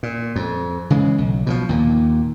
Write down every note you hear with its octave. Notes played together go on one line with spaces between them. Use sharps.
A#2
F2
C#3 E3 G#3
B1
B2 D#3 F3
D#2 A#2